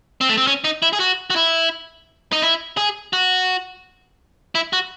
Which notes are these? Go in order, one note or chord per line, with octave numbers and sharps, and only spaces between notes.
C4
A3
C4
C#4
D#4
E4
G#4
F#4
F#4
E4
D#4
E4
G#4
F#4
E4
F#4